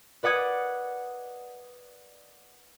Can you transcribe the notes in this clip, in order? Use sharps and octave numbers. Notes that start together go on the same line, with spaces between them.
B4 D5 F#5 D#6 G#6